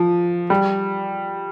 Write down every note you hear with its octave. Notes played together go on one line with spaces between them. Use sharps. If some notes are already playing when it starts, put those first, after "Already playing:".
Already playing: F3
G3